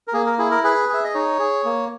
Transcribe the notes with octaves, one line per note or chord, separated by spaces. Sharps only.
A#4
A#3 G#4
A#4
E4 G#4
A#4
G#4 B4
G#4 E5
D#5
D#4 C#5
G#4
A#3